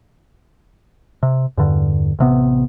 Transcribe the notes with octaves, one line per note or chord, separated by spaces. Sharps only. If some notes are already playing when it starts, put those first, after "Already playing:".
C3
E2 G2 D3
A1 C3 B3